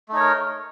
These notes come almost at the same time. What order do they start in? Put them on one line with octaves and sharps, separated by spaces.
A3 D#4 C#5 A#4